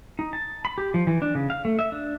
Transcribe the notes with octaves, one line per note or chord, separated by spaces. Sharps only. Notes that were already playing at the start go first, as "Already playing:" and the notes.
D#4
A5
B5
G4
F3
E3
D4
C#3
F5
A3
E5
D4